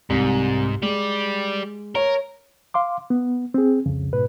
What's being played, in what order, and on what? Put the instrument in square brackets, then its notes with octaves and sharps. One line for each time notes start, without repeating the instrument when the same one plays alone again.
[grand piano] C2 [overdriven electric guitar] G#2
[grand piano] G#3 [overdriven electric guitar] G4 D5
[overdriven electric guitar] A#4 [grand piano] C#5
[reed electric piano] F5 C6 D6
B3
C4 G#4
C2 F2 C#3
G#2 B2 B4